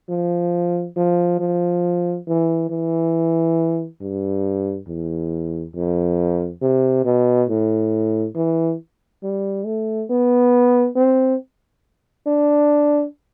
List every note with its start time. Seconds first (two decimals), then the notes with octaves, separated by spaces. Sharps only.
0.09 F3
0.97 F3
1.40 F3
2.28 E3
2.70 E3
4.01 G2
4.88 E2
5.74 F2
6.62 C3
7.05 B2
7.49 A2
8.35 E3
9.23 G3
9.66 A3
10.10 B3
10.96 C4
12.27 D4